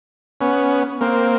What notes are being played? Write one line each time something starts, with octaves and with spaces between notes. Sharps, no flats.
B3 C#4
A#3 C4